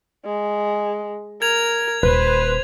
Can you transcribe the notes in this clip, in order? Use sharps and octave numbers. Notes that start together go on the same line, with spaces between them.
G#3
A#4 G#6 F7
D#1 B4 C5